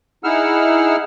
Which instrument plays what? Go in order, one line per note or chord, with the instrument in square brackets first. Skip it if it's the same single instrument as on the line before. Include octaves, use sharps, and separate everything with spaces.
[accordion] D#4 E4 G#4 F#5 E6 F6